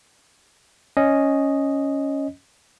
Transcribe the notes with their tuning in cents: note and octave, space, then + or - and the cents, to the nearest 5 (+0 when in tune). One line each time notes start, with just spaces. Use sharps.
C#4 +0 D#5 +0